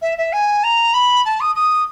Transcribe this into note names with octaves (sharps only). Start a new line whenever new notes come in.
E5
E5
G#5
A#5
B5
A5
D#6
D#6